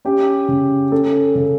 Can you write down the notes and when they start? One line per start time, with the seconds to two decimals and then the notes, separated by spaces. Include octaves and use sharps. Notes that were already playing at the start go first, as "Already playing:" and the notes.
0.05 C#4 G4
0.48 C#3
0.92 C#4 A4
1.35 C#3 A4